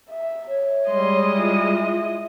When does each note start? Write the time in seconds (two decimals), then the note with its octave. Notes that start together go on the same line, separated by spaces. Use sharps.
0.10 E5
0.48 C#5
0.88 G3 G#3 D#5 C6
1.38 E4 F4